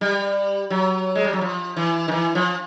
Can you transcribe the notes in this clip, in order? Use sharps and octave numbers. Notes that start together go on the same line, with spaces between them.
G3
F#3
G#3
G3
F#3
F3
E3
D#3
E3
F3